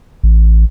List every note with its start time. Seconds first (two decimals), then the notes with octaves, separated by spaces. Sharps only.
0.23 A1